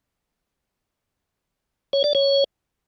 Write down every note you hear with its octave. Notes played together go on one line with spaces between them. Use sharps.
C#5
D5
C#5